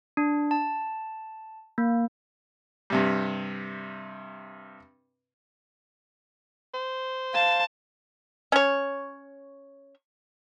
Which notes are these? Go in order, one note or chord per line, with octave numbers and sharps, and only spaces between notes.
D4
A5
A#3
G2 C3 G3
C5
F5 A5
C#4 C#5